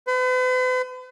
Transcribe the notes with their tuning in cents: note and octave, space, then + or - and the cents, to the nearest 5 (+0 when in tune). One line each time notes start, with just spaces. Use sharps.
B4 +45